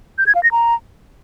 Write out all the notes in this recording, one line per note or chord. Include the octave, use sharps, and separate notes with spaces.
G6
G#6
F5
A#6
A#5